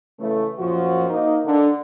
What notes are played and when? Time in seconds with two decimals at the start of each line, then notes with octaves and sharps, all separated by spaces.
0.19 C#3 E3 A3
0.58 F#2 A#2 F3 F#4
1.09 A#3 D#4
1.45 D3